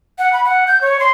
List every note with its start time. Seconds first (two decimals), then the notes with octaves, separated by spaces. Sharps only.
0.19 F#5
0.33 B5
0.45 F#5
0.67 G6
0.81 C#5
1.00 C6